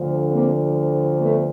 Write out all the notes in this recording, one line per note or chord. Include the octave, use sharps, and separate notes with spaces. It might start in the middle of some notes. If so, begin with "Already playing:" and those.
Already playing: D2 D3 F3
A#3 C4
A3 B3